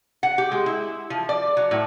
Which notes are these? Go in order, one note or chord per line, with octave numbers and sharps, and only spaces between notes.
F#5
G4
G#3
E4
F3
D5
F#3
A2